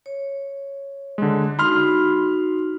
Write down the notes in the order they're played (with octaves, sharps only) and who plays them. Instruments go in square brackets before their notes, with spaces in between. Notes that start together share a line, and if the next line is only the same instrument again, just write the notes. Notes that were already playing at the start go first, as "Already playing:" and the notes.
[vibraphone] C#5
[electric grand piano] D3 G#3
[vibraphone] D#4 F#4 [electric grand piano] B5 C6 F6